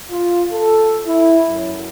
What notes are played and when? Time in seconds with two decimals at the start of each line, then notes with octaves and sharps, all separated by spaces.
0.11 F4
0.52 A4
1.07 E4
1.49 F#2